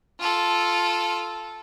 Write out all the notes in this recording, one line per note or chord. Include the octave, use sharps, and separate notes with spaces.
F4 A4